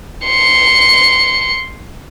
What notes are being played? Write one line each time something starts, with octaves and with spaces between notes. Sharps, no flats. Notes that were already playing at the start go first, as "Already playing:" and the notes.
C6 C#7